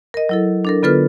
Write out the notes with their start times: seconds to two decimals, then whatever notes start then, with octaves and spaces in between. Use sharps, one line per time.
0.14 A#4 D#5
0.29 F#3 E4 A4
0.65 D4 A4 A#4
0.83 D3 B3 F4 A4 B4 F6